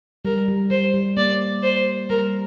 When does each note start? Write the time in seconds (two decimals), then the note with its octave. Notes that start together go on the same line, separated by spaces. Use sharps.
0.25 G3 A#4
0.48 G3
0.70 G3 C5
0.94 G3
1.17 A#3 D5
1.63 C5
2.10 G3 A#4